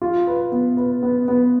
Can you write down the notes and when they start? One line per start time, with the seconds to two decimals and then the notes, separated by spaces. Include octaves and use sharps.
0.02 F4
0.27 B4
0.52 B3
0.77 B4
1.03 B3
1.28 B3